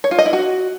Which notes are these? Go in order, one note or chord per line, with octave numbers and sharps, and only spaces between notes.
C#5
F4
D#5
E4
F#4